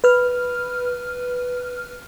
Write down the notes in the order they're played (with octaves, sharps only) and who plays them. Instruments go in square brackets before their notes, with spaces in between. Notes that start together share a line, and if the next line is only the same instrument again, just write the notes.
[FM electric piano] B4 F6